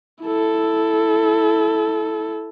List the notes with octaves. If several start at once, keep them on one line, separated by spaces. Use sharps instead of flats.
E4 A4